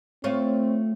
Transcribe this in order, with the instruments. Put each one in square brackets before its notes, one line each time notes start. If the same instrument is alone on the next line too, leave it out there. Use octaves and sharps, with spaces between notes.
[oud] A3 F4 C#5 [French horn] C4